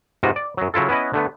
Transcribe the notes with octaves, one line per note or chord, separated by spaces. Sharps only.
G#2 C3 B3 F4 F#4
D5
F#2 F#3
C#3 F#3 E4 F4 A4
B3 C#4 E4 B4 D#5
D3 A3 B3